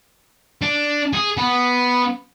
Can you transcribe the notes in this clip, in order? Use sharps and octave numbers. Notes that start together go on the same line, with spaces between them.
D4
G#4
B3